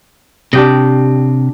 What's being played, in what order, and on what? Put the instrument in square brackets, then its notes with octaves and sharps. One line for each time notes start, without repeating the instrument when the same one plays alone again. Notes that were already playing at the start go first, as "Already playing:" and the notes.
[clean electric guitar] C3 [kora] D4 G4 D#5